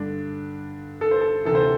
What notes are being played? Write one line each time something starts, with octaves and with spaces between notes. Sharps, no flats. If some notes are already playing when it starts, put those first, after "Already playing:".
Already playing: G2 D3 D4
A4
C5
A4
D2 C3 E3 A4
C5